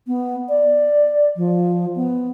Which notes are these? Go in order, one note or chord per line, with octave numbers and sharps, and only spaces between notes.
B3
D5
F3
B3